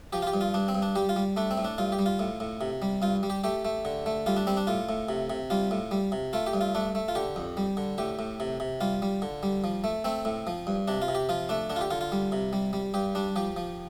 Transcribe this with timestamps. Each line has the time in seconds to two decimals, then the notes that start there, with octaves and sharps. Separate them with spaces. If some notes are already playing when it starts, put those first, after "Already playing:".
0.13 F3 G4
0.22 F4
0.27 G4
0.34 G2
0.41 F4
0.54 G2 D4
0.68 C4
0.75 G2
0.82 D4
0.95 G3 G4
1.09 F4
1.16 G3
1.37 A3 D4
1.51 C4
1.58 A2
1.65 D4
1.78 G2 F4
1.92 G4
1.99 G3
2.06 F4
2.19 A2
2.40 A2
2.61 C3
2.82 G3
3.02 G2 F4
3.23 G3
3.30 G4
3.44 A3 G4
3.65 A3
3.85 D3
4.06 A3
4.26 G3 F4
4.37 D4
4.47 G3 C4
4.57 D4
4.67 A2 F4
4.89 A2
5.09 C3
5.30 C3
5.50 G3 F4
5.71 A2
5.91 G3
6.12 C3
6.33 A3 F4
6.47 G4
6.53 G2
6.61 F4
6.75 A3 D4
6.95 A3
7.08 F4
7.15 D3 G4
7.36 F2
7.57 G3
7.77 D3
7.98 A2 G4
8.19 A2
8.40 C3
8.60 C3
8.81 G3 F4
9.02 G3
9.22 D3
9.43 G3
9.64 F3
9.84 A3
10.04 A3 C4
10.25 A2
10.47 F3
10.67 G2
10.88 C3 D4
11.02 F4
11.08 C3
11.15 G4
11.29 F3 F4
11.49 A3 D4
11.70 D3 D4
11.76 F4
11.81 G4
11.91 D3 F4
12.01 F4
12.12 G3
12.32 C3
12.53 G3
12.73 G3
12.94 G2 G4
13.15 G3 D4
13.36 F3 G4
13.57 F3